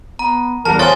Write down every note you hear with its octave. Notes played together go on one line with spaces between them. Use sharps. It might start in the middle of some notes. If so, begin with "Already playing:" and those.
B3 A#5
E2 G3 A#4 F#5 A5
F4 C5 C#5 F5 G#5 C#6 D#6 A6